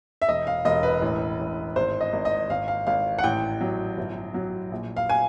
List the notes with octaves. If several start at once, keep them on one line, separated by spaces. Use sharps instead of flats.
E5
E1 D#5
F5
E1 D#5
B4
A1
A1
G#1 C5
D#5
G#1
D#5
G#1 F5
F5
G#1 F5
F#5
A1 G5
F#3
G1
F#3
A#1
F5
G#5